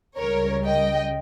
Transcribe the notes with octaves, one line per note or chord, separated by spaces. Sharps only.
C#2 C#3 G3 A#4 C#5
D#5 G5